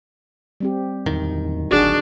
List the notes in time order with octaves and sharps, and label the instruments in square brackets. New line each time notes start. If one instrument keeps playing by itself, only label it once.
[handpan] G3 C4 G4
[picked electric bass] D1 D#3 [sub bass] E2
[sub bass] G#1 [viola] D4 [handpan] F#4 G#4